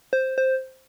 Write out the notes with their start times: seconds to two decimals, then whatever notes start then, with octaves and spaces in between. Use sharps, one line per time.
0.13 C5
0.38 C5